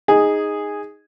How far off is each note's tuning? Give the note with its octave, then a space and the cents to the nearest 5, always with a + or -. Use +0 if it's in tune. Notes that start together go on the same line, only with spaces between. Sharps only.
D#4 +0 G#4 -10